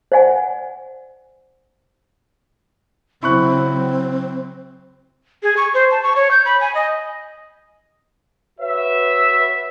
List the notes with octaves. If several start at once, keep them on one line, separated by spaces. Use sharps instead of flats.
C5 D5 F#5 G#5
C#3 F#3 C4 E4 C#6 F#6
G#4
C#6
C5
A5
C#6
C#5
G6
B5
G#5
D#5
F#4 B4 C#5 E5